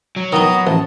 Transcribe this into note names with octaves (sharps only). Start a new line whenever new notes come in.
F#3
D#3 B3 D#4 A#5 D#6
A1 A5